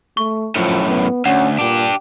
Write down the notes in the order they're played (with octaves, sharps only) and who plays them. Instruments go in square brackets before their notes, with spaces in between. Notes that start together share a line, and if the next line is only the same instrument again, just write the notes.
[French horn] A3 [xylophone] C#6
[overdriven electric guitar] F#2 A2 [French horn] F3
[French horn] B3
[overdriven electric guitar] D2 [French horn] C#4 [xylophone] F#5
[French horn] A#2 [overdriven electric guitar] D4 G4